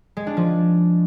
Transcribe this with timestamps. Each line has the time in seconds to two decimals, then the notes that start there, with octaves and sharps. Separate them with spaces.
0.17 G#3
0.27 D4
0.37 F3